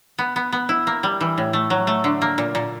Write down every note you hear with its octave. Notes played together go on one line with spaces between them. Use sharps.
B3
B3
B3
E4
A#3
G3
E3
A2
A3
F#3
A3
D3
A#3
A#2
A#2